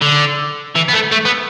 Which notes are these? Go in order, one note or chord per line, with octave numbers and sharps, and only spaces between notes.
D3
E3
B3
A3
A3
B3